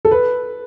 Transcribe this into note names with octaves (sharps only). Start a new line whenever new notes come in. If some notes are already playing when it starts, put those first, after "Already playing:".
A4
B4